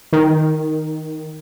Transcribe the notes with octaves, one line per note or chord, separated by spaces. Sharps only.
D#3